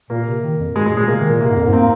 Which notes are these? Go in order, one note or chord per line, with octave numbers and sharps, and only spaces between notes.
A#2 A#3
C3
D#3
F2
A#2
G#2 G#3
G#3
A#2
G#3
C3 A#3
D#3
A#2
C3 A#3
G#2
F2
G#2
A#3 C4